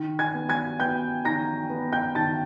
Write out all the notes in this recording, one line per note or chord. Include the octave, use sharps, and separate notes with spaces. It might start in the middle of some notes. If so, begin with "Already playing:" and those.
Already playing: D#3
G#5 G#6
B3
G#5 G#6
B3 G5 G6
D#3 A#5 A#6
B3
G5 G6
D#3 A5 A6